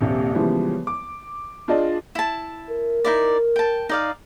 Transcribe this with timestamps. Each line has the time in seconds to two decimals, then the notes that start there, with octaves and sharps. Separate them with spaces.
0.01 D#1 A#1 C3
0.35 C#3 E3 F3 G3 G#3 B3
0.87 D6
1.68 D4 F4 G#4 D5 D#5 A5
2.15 E4 A5
2.70 A#4
3.05 D#4 E4 D5
3.56 G5 A5
3.89 D#4 D5 F5